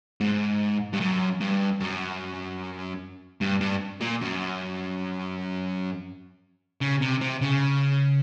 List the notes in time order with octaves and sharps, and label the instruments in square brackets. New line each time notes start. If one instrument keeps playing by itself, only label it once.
[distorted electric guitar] G#2
G2
F#2
G2
F#2
G2
G2
A#2
F#2
C#3
C3
C3
C#3